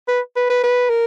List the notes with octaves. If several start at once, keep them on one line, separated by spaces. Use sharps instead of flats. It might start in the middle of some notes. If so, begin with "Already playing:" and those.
B4
B4
B4
B4
A#4